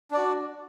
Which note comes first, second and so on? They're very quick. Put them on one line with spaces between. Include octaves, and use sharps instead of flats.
D4 D5 F#4